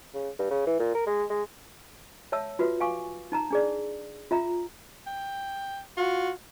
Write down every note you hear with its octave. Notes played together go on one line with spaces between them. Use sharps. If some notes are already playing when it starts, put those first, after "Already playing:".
C#3
G2
C#3
E3
A#2
A#4
G#3
G#3
C#5 E5 A5 E6
F4 F#4 B4 E5
F5 G#5 C#6 D6
D#4 A5 A#5
D4 G#4 D5
F4 E5 A#5
G5
F4 F#4